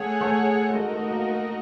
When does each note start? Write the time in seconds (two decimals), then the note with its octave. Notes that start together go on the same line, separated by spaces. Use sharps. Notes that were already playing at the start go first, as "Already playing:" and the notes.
Already playing: A3 G#4 C#5 F#5
0.21 A3
0.71 G#3
0.74 A3 D#4 F#4 A#4 D#5
0.93 A3
1.11 A#3
1.29 A3